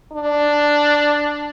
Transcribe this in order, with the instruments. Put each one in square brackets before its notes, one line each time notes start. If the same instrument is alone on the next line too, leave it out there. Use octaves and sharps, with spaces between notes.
[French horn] D4